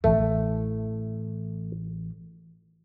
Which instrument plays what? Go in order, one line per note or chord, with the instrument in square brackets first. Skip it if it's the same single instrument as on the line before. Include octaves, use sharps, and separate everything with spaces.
[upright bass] A1 E3 [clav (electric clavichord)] A3